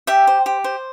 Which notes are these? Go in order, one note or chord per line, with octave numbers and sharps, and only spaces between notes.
G4 E5 G5
C5
G4
C5